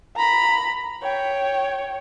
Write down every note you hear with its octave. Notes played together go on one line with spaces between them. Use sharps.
A#5 B5
C#5 G5